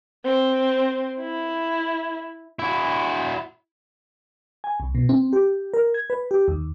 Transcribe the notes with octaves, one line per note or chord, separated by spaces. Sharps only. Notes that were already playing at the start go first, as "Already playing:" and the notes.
C4
E4
E4 F#4
G#5
C2
B2
C4
G4
A#4
G#6
B4
G4
D#2